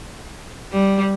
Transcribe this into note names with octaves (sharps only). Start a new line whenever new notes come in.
G3